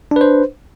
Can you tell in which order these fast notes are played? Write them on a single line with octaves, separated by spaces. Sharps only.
D4 B4 C5